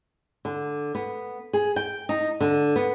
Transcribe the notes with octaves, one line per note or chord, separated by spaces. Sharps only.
D3
B3
G#4
G5
D#4
D3
B3